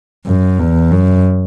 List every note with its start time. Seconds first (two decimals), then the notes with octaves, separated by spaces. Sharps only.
0.26 F#2
0.59 E2
0.91 F#2